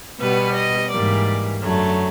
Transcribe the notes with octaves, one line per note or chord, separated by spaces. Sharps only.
B2 G3 B3 B4
D#5
G#2 E3 G3 A#3 D5
F#2 D3 F#3 A3